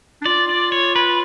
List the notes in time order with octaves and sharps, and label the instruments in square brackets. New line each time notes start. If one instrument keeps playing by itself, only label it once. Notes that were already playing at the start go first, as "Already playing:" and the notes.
[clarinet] D4
[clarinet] F4 [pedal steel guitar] D5
[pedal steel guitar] D5
C#5
B4